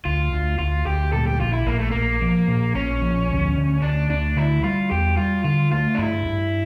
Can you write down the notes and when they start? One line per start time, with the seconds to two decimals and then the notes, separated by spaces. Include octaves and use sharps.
0.05 D2 F4
0.32 D2
0.58 D2 F4
0.86 D2 G4
1.13 A#2 A4
1.27 G4
1.40 A#1 F4
1.53 E4
1.67 A#1 A#3
1.79 A3
1.91 A#1 A#3
2.21 F3
2.48 A#2
2.75 A#1 C#4
3.02 F3
3.29 D2
3.56 D3
3.82 D2 D4
4.10 D2 D4
4.36 D3 E4
4.63 G3 F4
4.91 E2 G4
5.17 G3 F4
5.44 D3 F4
5.72 A3 F4
5.95 D4
5.98 G2 E4
6.26 G2